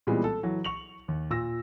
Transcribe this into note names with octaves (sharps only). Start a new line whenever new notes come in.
A#2 E3 G3 G#3 B3 C4
A4
E3 F#3
C#6 F7 F#7
D#2
A#2 E6 A#6